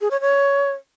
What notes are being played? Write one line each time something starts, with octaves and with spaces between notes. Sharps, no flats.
G#4
C#5
C#5